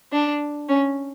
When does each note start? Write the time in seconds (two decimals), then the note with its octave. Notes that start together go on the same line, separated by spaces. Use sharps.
0.12 D4
0.69 C#4